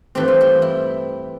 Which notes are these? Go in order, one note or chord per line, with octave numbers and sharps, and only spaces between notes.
G2 E3 A3 C4 G4
F4
G4
E4